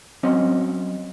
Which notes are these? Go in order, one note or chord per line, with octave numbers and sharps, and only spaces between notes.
F#3 C4 C#4 D#5